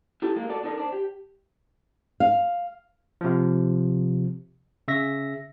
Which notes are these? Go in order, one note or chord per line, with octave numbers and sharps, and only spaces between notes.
E4 G4 A4
G#3 A#3
F#4 A4 D5
D4 D#4 A4 A#4
D4 B4 C5
G4
F5
C3 F3
C#3 E5 A#6